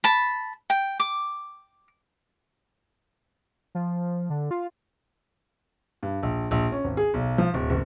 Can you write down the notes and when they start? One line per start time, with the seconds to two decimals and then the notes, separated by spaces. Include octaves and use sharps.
0.04 A5 B5
0.70 G5
1.00 D6
3.75 F3
4.30 D3
4.51 F4
6.03 G2
6.23 A#1
6.51 A#1
6.72 C#4
6.84 G#1
6.97 G#4
7.14 B1
7.38 F3
7.54 D1
7.70 F#1